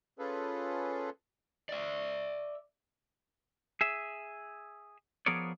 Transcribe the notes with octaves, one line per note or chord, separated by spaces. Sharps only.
C#4 F4 G#4 A4 B4
D5 E5
G#4 E5
F3 B3 G#4 A#4 C#5 D5